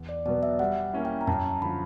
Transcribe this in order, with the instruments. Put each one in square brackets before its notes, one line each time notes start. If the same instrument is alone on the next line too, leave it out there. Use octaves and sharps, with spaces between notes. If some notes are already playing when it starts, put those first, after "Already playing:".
Already playing: [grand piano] E2
[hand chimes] D5
[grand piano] B2 F#3 B3 [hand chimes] D5
[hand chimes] E5
[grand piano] G3 [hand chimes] F#5
[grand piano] A#3 C#4 E4
[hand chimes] G5
A#5
[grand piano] F#2 [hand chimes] A5
[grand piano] D3 F3 [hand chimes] B5